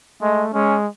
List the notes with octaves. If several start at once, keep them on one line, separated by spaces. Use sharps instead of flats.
G#3 A3
G#3 C#4